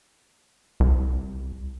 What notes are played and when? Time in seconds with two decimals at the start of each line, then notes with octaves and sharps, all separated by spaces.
0.80 C2